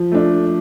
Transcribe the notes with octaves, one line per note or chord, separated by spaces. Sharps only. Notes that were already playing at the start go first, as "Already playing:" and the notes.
Already playing: F3
A3 D4